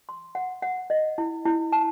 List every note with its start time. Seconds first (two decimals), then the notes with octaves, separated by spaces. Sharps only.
0.09 C6
0.35 F#5
0.62 F#5
0.90 D#5
1.18 E4
1.46 E4
1.72 A5